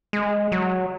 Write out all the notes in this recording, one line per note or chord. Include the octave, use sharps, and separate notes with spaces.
G#3
F#3